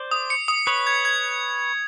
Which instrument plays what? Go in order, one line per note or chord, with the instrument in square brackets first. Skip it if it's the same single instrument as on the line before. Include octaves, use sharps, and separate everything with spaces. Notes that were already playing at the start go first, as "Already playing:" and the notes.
Already playing: [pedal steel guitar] C5 D5
[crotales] D#6
C#7
D#6
[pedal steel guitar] B4 C#5 [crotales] D#6
[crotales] G#6
G#6